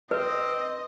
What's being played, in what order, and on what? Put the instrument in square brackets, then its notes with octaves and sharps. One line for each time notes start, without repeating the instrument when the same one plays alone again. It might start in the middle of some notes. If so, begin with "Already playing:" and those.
[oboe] C4 [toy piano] B4 [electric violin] D#5